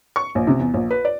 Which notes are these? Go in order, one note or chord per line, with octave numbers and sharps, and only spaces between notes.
C#6
A#1
C3
E2
A#1
B4
D5